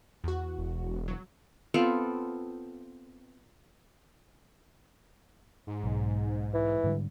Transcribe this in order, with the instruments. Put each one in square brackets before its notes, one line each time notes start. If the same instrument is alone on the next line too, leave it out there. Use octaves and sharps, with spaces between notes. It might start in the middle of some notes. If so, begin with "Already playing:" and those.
[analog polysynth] E2 F#4
[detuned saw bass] E1
[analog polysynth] F#3
[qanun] B3 C4 F4 A4
[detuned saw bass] G#2
[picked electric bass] B1
[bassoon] E3
[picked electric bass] G#2 D3 G3